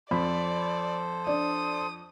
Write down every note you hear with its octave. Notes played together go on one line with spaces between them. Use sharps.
F2 A4 C5 D5 B5
D4 D#6